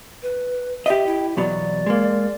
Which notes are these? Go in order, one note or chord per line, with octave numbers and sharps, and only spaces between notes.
B4
G4 D#5 E5
E4
E2 B2 F#3 D5
G#3 A#3